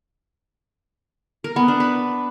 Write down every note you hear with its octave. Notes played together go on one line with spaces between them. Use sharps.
A#4
B3
D4
B4